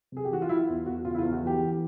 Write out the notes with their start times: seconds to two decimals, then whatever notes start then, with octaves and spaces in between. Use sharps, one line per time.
0.12 C3 G#4
0.25 G4
0.31 E3 F#4
0.42 F4
0.49 E3 E4
0.68 E2 F4
0.86 E2 F#4
1.05 C#3 F4
1.15 E4
1.19 F4
1.23 E2
1.33 F#4
1.43 E3 G4
1.60 E3